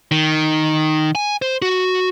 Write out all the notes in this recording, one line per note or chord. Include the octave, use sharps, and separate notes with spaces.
D#3
G#5
C5
F#4